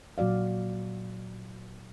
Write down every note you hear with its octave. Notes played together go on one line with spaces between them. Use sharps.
A#2 F#3 F#4 D5 F5